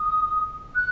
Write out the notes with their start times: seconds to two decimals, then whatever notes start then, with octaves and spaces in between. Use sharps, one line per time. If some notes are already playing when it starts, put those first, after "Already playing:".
Already playing: D#6
0.75 F#6